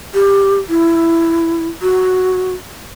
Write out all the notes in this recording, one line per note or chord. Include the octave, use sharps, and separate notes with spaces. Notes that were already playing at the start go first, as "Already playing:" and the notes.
G4
E4
F#4